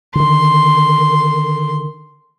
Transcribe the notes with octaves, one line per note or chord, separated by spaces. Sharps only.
D3 D#3 C6